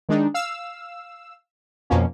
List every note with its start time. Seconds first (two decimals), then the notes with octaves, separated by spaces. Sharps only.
0.09 D#3 G#3 D4 D#4
0.34 F5 E6
1.90 F2 B2 F3 A#3 C#4